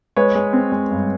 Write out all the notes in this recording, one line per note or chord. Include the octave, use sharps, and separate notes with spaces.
G#3 B4 C#5
G#3
C4
G#3
G2